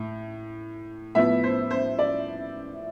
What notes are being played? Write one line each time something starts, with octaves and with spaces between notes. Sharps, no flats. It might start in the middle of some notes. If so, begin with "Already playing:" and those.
Already playing: A2
A2 F3 B3 E5
C5
C5
D5